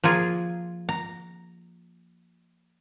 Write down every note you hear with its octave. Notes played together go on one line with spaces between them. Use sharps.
F3 A#3 F4 G#4
A#5